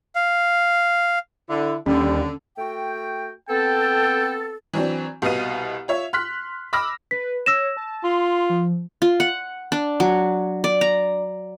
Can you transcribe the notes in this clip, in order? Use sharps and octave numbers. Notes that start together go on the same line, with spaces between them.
F5
D3 E4
D#2 D3 G3 C#4
A3 F#4 G5
B3 C4 A4 G5
E3 F#3 C4 D4
C2 B2 B3 D#5 F5 D#7
F4 C#5 E5
C6 F6 F#6 B6
B5 D6 E6 F6 A#6
B4 B6
C#5 E6 A#6 E7
A5
F4 C6
F3
F4
F#5
D4
F#3
D5
A#5